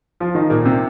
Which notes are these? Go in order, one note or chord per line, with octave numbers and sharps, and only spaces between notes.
F3 F4
D#3 D#4
A#2 A#3
C3 C4